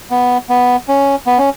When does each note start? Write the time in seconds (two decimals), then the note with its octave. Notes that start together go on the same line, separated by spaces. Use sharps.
0.11 B3
0.49 B3
0.88 C#4
1.26 B3
1.38 C#4